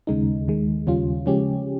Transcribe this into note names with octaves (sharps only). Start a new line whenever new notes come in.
D#2 C#3 G#3 D#4
D#2 D#3 G#3
D#2 C#3 G3 C#4 F4
C#3 F3 G#3 C#4 G4